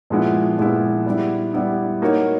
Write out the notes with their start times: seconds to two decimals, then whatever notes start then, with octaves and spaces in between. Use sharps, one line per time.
0.10 A#2 F3 G#3 B3 E4
0.58 A#2 F3 G#3 B3 E4
1.06 G3 B3 E4
1.54 G3 B3 E4
2.02 A#3 D#4 F#4 A#4 C#5